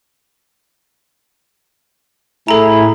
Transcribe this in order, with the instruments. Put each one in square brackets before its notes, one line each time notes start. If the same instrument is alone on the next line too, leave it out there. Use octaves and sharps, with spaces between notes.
[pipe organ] A2 G#4 [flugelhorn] E4 [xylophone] A4 A#5